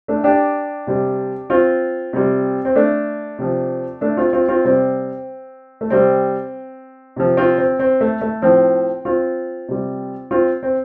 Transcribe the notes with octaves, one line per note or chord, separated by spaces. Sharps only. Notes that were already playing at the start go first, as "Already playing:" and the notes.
A3 D4
D4 G4
C3 G3
C4 F4
C3 G3
C4
A3 D4
C3 F3
A3 D4
C4 F4
C4 F4
C4 F4
C3 G3 C4
A3
C3 G3 C4
C3 F3
C4 F4
C4
C4
A3
A3
A2 F3 C4
C4 F4
C3 G3
C4 F4
C4